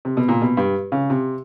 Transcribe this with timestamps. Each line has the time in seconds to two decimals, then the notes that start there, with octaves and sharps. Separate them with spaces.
0.05 C3
0.17 B2
0.28 A#2
0.42 B2
0.57 G2
0.92 C#3
1.10 C3